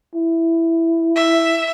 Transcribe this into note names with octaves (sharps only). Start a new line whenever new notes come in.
E4
E5